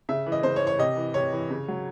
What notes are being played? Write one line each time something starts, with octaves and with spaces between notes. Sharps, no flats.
C#3 E5
E3
D#5
C#3 C5
C#5
E3
C#5
C3 D#5
E3
C3 C#5
E3
C#3
F#3